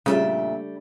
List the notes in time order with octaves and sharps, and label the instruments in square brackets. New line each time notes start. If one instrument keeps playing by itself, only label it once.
[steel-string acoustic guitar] F2 A#2 E5 [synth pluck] C#3 [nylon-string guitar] G3 A3 D4